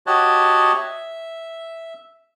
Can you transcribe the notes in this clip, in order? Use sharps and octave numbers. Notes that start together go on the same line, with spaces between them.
F#4 G4 C#5 D#5 F#5 A5
E5